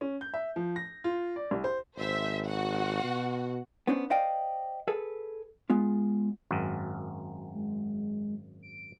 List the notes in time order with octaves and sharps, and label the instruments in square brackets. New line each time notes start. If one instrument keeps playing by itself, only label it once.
[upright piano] C#4
G6
E5
F3
A#6
F4
D5
C2
C5
[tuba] G#1 [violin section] C5 E5
[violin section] F#4 F#5
[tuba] B2
[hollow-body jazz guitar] B3 C#4 D4 C5
C5 D5 D#5 F5 G5
G#4 A4 B4
G#3 B3 F4
[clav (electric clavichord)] G#1 F#2
[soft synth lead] G#3
D7